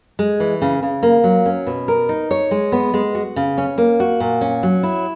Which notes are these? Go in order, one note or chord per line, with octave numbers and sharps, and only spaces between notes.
G#3
E3
C#3
C#3
A#3
F#3
C#4
B2
A#4
D#4
C#5
G#3
B3
G#3
F#4
C#3
C#4
A#3
F#4
A#2
C#4
F#3
E4